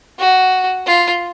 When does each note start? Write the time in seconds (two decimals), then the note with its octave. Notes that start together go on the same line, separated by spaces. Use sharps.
0.19 F#4
0.86 F4